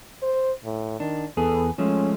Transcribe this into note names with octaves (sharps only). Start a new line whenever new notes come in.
C5
A2
D#3 D4
E2 B3 G#4 A4
F3 G#3 A3 C#4